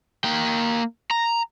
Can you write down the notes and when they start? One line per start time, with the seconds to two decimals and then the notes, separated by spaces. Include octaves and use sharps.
0.24 A#3 G5
1.11 A#5